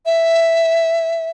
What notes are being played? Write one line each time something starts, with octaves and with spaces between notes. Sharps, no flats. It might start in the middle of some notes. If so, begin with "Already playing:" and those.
E5